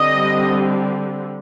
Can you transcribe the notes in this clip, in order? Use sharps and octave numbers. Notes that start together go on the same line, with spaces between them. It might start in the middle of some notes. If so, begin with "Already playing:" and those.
Already playing: D3 G3 C4 D#5